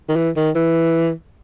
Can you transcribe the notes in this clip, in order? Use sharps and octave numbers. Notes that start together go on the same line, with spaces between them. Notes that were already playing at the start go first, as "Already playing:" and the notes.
D#3
E3
D#3
E3